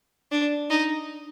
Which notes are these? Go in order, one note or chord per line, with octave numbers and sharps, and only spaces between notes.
D4
D#4